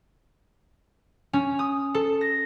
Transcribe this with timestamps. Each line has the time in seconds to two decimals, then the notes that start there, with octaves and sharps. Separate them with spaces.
1.33 C#4
1.59 D#6
1.94 A4
2.21 A#6